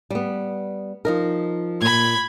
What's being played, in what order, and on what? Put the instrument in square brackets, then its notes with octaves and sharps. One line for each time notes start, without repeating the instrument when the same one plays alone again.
[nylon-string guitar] G3 B3
F3 D#4 A#4
[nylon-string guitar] A#2 [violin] B5 G#6